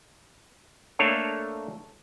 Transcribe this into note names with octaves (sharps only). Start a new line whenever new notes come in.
A3 A#3 D4 A4 C#5 F5